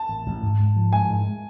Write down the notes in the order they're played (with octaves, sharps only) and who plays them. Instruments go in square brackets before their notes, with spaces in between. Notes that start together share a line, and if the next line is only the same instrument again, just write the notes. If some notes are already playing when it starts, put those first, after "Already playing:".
Already playing: [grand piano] A5
[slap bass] A1
A1
G#2
G#2
F3
[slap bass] G#3 [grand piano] G#5
[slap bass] G#2